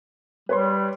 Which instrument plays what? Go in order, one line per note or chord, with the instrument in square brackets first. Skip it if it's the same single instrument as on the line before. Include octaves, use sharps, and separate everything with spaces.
[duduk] G3 [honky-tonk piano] B4 C#5 C6